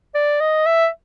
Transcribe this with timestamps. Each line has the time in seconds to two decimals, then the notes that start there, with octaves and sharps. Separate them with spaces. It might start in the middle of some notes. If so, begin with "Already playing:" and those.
0.14 D5
0.40 D#5
0.66 E5